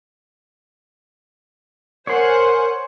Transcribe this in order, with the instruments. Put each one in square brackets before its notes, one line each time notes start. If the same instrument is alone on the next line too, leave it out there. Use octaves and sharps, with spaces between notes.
[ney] A#4 [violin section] C5 F#5 G#5 [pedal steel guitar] C#5 C6